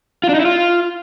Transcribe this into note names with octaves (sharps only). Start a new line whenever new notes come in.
F4
D4
D#4
E4
F4